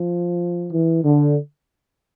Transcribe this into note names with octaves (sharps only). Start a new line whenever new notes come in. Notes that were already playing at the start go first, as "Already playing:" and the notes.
Already playing: F3
E3
D3